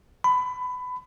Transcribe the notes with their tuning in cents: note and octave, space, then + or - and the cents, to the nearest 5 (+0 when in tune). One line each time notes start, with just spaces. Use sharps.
B5 +20